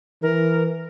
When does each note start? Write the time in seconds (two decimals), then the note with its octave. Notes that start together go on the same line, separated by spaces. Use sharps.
0.22 E3 A#4